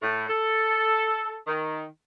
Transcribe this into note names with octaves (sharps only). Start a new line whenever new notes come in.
A2
A4
D#3